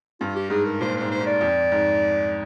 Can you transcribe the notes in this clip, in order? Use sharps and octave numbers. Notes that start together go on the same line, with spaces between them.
G2 F4
G4
G#2 G#4
A#4
A#2 C5
G#2 C5
C5
G#2
D5
F2
G#2